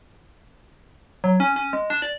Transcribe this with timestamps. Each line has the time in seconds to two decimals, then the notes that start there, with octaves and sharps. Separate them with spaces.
1.24 F#3
1.40 C#4
1.56 C#4
1.73 G#3
1.90 D4
2.02 D5